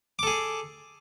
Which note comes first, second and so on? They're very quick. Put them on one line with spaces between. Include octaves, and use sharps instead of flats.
D6 A4 G#4